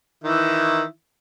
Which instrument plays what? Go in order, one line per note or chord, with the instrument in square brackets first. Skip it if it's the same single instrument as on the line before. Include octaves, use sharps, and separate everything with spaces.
[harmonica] D#3 E3 E4